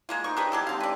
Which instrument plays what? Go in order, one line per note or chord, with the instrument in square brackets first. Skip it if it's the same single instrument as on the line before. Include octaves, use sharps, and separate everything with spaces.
[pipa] G#3 A#3 F4
[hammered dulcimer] D#4 C5 D6 [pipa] C#6
[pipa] D4 A#4 B4 [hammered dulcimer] G4 C#5
[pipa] F#3 G4 A4 [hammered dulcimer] E4
[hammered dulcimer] D3 G#3 C4 [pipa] F5 A5
[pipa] B4 D5